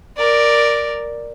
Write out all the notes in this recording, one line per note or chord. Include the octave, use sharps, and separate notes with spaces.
A#4 D5